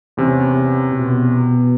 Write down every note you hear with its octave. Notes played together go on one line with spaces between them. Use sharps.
E2 C3 C#4
B2